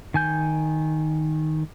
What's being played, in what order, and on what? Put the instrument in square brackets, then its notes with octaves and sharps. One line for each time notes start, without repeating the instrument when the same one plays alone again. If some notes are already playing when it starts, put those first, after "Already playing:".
[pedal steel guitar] D#3 G#5 G6